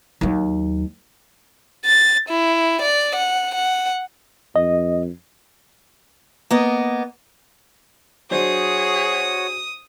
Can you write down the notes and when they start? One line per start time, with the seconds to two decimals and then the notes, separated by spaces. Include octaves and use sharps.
0.21 D#2 F#3
1.85 A6
2.29 E4
2.82 D5
3.16 F#5
3.55 F#5
4.56 F2 D#5
6.51 A#3 B3 D#5
8.31 F#3 D4 F#4 G#4 C5 C#5 D#6